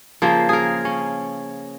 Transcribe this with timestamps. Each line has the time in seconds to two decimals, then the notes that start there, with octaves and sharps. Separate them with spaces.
0.22 C#3 F3 A#3 C5
0.49 G#4 A#4
0.85 C#4